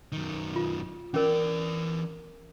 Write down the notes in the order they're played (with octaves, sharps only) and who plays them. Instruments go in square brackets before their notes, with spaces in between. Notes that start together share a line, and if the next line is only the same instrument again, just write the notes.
[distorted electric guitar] F#2 D#3
[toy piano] F4
[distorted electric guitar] E3 D5 [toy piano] C#4 A#4